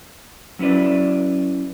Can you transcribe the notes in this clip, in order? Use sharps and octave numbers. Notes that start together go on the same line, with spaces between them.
F#3 C#4 E4 B4 D5